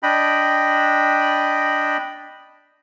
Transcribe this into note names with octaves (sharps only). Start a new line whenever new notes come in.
D4 D#5 G5 B5